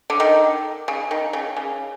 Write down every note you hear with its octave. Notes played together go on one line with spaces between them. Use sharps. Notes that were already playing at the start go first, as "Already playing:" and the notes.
D3
D#3
C#3
D#3
C#3
C#3